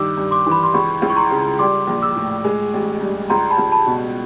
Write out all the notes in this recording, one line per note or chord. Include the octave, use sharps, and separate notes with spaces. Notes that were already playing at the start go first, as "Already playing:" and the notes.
Already playing: G2 D#3 D6 E6
G2
C6 D6
E3
B5
C6
C#2 B5 C#6
C#2
C#6
A#5 C6
C#3
G3 C6 D6
A#1
D6 E6
A2
G#3
A1
G2
C#2 A#5 C6
A5 B5
C#2
A5 B5
B2